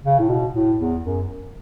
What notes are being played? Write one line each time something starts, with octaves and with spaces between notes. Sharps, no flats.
C#3
A2
B2
A2
E2
F#2